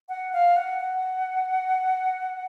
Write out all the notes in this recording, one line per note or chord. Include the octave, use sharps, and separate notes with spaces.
F#5
F5
F#5
F#5